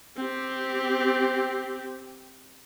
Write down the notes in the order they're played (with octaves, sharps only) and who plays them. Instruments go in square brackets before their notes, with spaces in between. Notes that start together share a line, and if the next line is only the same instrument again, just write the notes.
[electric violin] C4 G4